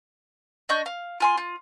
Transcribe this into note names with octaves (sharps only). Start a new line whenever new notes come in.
D4 D#5 C#6 G6
F5
F4 G#5 C6
F4